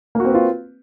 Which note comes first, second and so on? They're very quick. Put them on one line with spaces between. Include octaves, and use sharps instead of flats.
A#3 F#4 C4 B4 F4